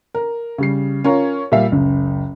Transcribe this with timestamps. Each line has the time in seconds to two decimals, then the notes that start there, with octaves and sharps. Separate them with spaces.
0.15 A#4
0.58 C#3 G3 C7
1.04 C#4 F4 A#4 C#5
1.52 A#2 G3 E5 F5
1.72 F#1 C#2